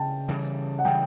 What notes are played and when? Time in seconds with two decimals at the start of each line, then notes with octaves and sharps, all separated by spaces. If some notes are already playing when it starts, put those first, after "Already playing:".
Already playing: C#3 G5 A5
0.28 C#3 E3 G3
0.79 F#5
0.84 C#3 E3 G3 G5